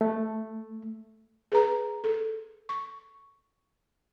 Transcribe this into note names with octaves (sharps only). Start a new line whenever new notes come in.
A3
G#4 B4 A#5
A4
C#6